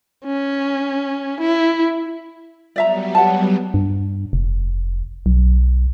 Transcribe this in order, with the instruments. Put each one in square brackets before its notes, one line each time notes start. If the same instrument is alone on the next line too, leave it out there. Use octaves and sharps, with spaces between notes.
[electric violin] C#4
E4
[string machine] F#3 G3 B3 [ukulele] D5 E5 A#5
[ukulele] F#5 A5
[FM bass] G2
F1
B1